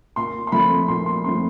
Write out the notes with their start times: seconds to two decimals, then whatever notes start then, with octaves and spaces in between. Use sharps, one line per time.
0.16 A#2 C6
0.47 C6
0.52 F3 A3 C4 B5
0.88 A#2 C6
1.06 C6
1.24 F3 A3 C4 C6